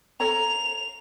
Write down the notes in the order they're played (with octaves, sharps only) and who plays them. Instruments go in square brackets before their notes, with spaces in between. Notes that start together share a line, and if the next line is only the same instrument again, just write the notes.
[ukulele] A4 C#5 A#5 [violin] F7